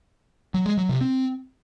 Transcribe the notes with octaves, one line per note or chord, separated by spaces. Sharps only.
F#3
G#3
F#3
C3
C4